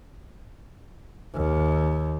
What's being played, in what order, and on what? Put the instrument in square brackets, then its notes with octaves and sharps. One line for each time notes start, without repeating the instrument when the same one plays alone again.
[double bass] D#2